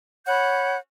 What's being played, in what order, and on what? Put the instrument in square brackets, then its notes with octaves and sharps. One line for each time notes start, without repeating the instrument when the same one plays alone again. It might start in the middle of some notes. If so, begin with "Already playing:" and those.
[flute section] C#5 B5 G6 [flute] F#5